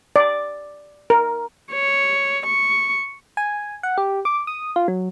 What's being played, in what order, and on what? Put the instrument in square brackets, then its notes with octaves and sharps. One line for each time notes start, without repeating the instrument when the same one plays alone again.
[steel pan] D5
A#4
[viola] C#5
C#6
[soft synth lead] G#5
F#5
G4
D6
D#6
F4
F#3